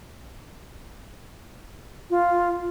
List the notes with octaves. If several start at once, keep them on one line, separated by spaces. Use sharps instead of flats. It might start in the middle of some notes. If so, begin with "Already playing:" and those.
F4